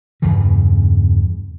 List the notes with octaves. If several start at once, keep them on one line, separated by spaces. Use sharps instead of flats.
E2 G2 C#3 E3